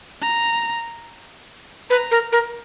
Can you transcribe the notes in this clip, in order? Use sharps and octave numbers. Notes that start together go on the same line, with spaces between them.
A#5
B4 A#5
A#4
A#4